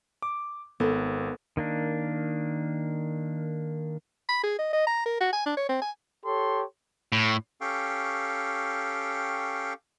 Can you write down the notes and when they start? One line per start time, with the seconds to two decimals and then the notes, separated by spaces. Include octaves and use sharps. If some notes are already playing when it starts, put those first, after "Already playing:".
0.22 D6
0.80 G#1 B3 A4 A#4
1.57 D#3 A#3 D4
4.29 B5
4.43 G#4
4.59 D#5
4.73 D#5
4.87 A#5
5.06 A#4
5.21 F#4
5.33 G#5
5.46 D4
5.57 C#5
5.69 C4
5.82 G#5
6.25 G4 A4 C#5 C6
7.12 A2
7.61 C#4 G4 A4 F5 G5 C#6